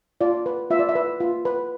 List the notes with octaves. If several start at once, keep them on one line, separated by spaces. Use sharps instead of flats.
F4 D5
B4
F4 E5
D5
E5
B4
F4
B4